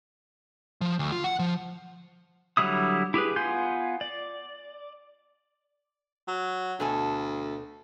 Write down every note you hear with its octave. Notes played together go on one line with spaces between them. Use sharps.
F3
D2
F4
F#5
F3
D3 F#3 G3 E4 D#6
E4 G4 G#4 B4
B3 F4 G#5 C6 G6
D5
F#3
D2 B2 A4 G#5